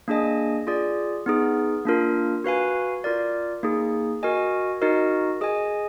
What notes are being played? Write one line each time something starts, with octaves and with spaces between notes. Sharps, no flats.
A#3 D4 G#4 D#5 G#5
F4 G#4 D5
B3 D#4 G#4
A#3 D4 F4 A#4
F#4 B4 F5 G#5
F4 A#4 D5
A#3 D#4 G#4
F#4 A#4 D#5 G#5
D#4 F#4 A#4 D#5
G#4 D#5 G#5